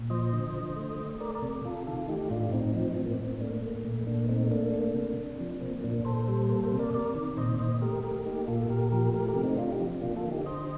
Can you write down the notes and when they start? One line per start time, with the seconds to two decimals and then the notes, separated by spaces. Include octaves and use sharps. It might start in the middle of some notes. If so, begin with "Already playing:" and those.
Already playing: A#2
0.10 F3 C5 D#5
0.33 D3
0.55 D3
0.76 A3
0.99 A3
1.20 A3 A#4 D5
1.35 A#4 D5
1.42 C3
1.65 C3 F4 A4
1.87 D#3 F4 A4
2.08 A3 D#4 G4
2.30 A2 D4 F4
2.52 A2 C4 D#4
2.75 F3 C4 D#4
2.96 A2 C4
3.06 A#3
3.11 C4
3.19 A2
3.26 C4
3.41 A3 A#3 D4
3.63 A3 A#3
3.85 A#2
4.07 A#2 A#3 D4
4.29 A3 C4 D#4
4.51 A3 A#3 D4
4.74 A#3
4.95 C3
5.17 C3
5.40 F3
5.61 A#3 C4
5.83 A#2 A#3 D4
6.05 A#2 A4 C5
6.28 G3
6.49 A#3 A4 C5
6.64 A4 C5
6.72 C3
6.79 A#4 D5
6.93 C3 A#4 D5
7.15 D#3
7.37 A#2 C5 D#5
7.59 A#2 C5 D#5
7.81 A3 G4 A#4
8.03 A3 G4 A#4
8.25 A#3 D#4 G4
8.47 A#2 F4 A4
8.69 A#2 G4 A#4
8.92 F3 G4 A#4
9.14 A3 G4 A#4
9.28 G4 A#4
9.35 C3
9.43 C4 D#4
9.58 C3 D4 F4
9.72 D#4 G4
9.80 F3
10.02 A#3 D4 F4
10.16 F4 A4
10.24 D3
10.31 D#4 G4
10.46 D3 C5 D#5